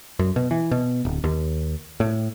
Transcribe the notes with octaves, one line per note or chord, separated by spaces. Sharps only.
F#2
B2
E3
B2
D1
D#2
A2